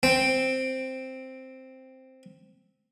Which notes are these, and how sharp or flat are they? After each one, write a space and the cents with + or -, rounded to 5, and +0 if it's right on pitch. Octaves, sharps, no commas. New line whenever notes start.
C4 +0 G5 +0